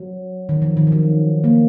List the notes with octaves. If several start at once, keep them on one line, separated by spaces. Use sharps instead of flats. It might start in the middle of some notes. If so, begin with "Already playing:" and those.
Already playing: F#3
D#3
F3
D#3
F3
F#3
A#3